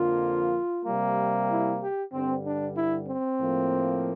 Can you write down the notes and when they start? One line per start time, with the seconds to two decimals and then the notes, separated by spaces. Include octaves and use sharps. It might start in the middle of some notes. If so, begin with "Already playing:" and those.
Already playing: F2 D3 F3 A#3 F4
0.85 C3 G3 A#3
1.49 E4
1.81 G4
2.12 G2 D3 G3 C4
2.44 D4
2.77 E4
3.08 C4
3.40 A2 F3 A#3